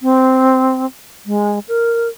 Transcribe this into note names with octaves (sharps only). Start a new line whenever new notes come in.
C4
G#3
A#4